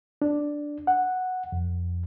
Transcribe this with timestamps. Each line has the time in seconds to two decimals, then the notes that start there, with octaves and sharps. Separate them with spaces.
0.22 D4
0.87 F#5
1.52 F2